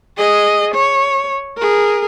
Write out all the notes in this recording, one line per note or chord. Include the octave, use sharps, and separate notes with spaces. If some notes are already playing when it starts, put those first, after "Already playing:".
G#4 D#5
C#5
G#4 A#4